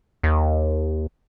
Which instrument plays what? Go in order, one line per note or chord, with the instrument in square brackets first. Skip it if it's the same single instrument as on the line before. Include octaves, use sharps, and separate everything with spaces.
[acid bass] D#2